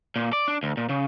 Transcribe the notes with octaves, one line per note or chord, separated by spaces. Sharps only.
A#2
D5
D4
D2
A#2
C#3